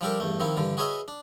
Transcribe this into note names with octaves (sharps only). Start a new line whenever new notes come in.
F3 G3 D4 G4 A4 A#4
E2 G2 A3
D#3 F3 C4 E4
G2 D3 E3
F#4 G#4 B4 C#5 D#5 E5
D4